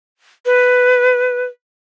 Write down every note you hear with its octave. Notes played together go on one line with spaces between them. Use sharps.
B4